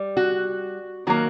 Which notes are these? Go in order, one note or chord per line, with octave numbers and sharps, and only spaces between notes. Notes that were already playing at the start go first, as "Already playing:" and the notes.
Already playing: G3
F#4
D#3 F#3 A#3 F#4